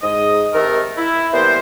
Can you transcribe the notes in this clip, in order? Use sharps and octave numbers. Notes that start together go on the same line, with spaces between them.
G#2 D#5
C3 D#3 A3 A#4
E4
E3 G3 A#3 B3 A#4 C5